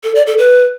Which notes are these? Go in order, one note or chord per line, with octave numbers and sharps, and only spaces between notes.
A4
D5
A4
B4